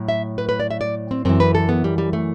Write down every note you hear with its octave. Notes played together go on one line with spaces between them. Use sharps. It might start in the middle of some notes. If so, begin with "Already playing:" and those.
Already playing: A2 F#3
E5
B4
B4
D5
E5
D5
C4
F#2 E3 C4
B4
A4
B3
G3
G3
A3